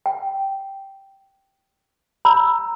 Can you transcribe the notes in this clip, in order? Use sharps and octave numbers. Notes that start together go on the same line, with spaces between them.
G5
A#5 B5 E6